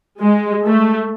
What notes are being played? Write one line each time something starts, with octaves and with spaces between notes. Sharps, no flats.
G#3
A3